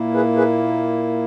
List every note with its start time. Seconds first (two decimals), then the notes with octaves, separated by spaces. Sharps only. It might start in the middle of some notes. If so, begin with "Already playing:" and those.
Already playing: A#2 A#3 E4
0.14 G#4 B4
0.36 G#4 B4